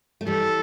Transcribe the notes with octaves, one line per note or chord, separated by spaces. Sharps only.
A3
E3 G3 A4